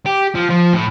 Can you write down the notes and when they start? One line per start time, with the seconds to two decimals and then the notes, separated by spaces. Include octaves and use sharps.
0.06 G4
0.35 F3
0.50 F3
0.74 A2